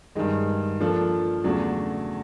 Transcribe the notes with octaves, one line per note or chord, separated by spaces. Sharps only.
G2 D#3 G#3
F3 A#3 D4 F4 A4
E2 C#3 F#3 A3 D4